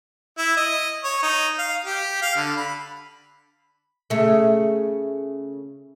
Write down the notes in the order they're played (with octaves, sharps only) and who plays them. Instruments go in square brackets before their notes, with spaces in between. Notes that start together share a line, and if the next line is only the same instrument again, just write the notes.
[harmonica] E4
D#5
C#5
D#4
F5
G4
F5
D3
B5
[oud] C#3 A3